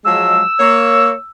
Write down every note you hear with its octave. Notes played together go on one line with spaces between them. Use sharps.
F3 F#3 G#3 E6
A#3 C#5